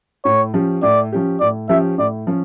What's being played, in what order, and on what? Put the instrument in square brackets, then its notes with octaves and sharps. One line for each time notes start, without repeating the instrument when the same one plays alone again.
[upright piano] A2 [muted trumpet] C#5
[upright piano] F3 C#4 G4
[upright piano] A2 [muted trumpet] D5
[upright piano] F3 C#4 G4
[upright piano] A2 [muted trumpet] D5
[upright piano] F3 C#4 G4 [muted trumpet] E5
[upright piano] A2 [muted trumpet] D5
[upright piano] F3 C#4